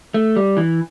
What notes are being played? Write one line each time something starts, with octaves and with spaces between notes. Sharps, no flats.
A3
G3
E3